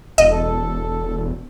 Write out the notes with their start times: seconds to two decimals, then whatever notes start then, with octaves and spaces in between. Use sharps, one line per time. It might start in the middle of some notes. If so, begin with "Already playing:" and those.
0.18 E1 D#5
0.31 A4